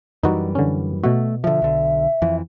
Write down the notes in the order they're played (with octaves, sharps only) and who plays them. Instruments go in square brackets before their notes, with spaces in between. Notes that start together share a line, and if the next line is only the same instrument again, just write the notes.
[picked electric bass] F#2 E3 G3 [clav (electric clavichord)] D#4 F#4
[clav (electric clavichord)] D3 C#4
[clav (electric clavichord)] B2 F#4 [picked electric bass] A3
[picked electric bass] D3 F3 [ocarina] E5
[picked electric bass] B1 D3
F2 E3